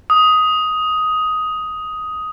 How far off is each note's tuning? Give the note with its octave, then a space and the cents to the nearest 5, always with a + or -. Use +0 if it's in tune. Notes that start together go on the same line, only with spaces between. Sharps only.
D#6 +10